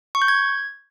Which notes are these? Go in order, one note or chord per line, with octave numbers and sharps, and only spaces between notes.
C#6
G6
G#6